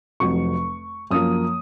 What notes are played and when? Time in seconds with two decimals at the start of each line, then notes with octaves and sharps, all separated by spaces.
0.20 F1 F2 C3 F#3 C#6
1.11 F#2 F3 A#3 D#6